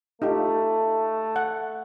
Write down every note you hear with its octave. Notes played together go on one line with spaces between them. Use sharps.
A3 D#4 F4 G4
F#5